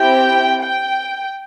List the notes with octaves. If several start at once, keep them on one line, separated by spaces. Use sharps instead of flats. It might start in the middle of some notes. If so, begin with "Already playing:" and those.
Already playing: C4 E4 G4 G5
G5